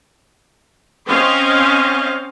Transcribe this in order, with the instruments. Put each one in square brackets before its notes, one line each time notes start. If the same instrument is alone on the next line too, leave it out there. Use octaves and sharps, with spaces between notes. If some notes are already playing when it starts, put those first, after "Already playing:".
[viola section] C4 C#4 C5 D#5 F5